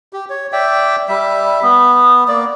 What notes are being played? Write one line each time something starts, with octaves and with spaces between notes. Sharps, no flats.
G4
C#5
D5 E5 G5
G3 E5
B3
A#3 D5